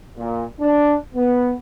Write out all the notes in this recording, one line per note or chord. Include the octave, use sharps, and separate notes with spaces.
A#2
D4
B3